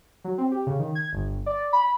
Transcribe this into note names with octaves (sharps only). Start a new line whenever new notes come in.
F#3
C4
G4
C#3
D#3
G#6
G1
D5
B5